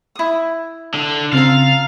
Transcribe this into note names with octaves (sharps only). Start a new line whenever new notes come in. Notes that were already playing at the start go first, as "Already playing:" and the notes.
E4 D#6
D3
C#3 C4 F4 A4 F5 A#5 A6